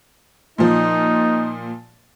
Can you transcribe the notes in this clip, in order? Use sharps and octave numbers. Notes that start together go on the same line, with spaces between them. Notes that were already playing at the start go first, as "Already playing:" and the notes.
A#2 F3 D#4